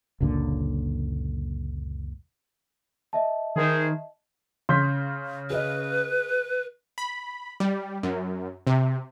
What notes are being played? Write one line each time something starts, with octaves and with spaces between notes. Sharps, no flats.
F#1 C#2 A#2 D3
D#5 E5 A5
D#3 G#4 C5
C#3 C6 G6 B6
G#4 B4 D#5
B5
G3
F#2
C3